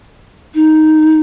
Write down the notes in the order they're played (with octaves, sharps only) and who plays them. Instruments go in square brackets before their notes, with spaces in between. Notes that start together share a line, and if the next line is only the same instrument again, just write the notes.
[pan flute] D#4